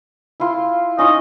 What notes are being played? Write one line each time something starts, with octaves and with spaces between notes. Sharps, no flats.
E4 F4 C6
C#4 D#4 F4 D#5